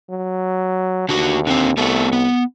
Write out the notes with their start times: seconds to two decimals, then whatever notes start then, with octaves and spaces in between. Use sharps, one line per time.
0.10 F#3
1.09 D#2 D3 F#4
1.47 D3 C4
1.77 C2 A3 B3 A4
2.13 B3